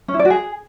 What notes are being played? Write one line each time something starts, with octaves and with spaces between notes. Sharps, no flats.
C#4
E4
D5
F#4
G#4